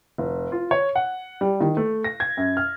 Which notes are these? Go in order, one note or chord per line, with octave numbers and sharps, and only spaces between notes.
F1
F4
C#5
F#5
G3
D#3
A3
A#6
G#6
F#2
F6